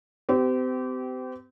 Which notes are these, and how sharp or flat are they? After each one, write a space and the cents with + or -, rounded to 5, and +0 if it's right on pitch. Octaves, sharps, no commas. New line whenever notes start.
C4 -40 G4 -25